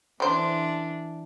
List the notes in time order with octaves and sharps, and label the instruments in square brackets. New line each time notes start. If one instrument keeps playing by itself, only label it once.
[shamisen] D3 C5 [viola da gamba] E3 D4